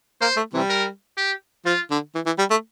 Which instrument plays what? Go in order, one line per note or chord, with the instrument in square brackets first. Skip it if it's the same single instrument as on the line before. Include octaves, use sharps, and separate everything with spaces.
[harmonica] A#3 [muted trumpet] C5
[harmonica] A3
C3 E3 G3
[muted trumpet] A#4
G4
[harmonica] F3 [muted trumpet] F4
[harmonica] D3
E3
E3
G3
A3